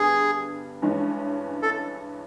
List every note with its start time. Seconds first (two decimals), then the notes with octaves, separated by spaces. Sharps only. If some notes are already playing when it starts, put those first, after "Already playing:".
Already playing: G2 D3 G3 B3 G#4
0.82 G2 E3 G#3 C#4
1.62 A4